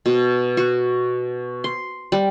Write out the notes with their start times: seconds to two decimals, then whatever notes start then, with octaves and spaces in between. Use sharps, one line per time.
0.06 B2
0.57 F#4
1.64 C6
2.12 G3